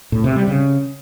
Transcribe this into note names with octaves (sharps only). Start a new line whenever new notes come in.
A2
C3
G3
C#3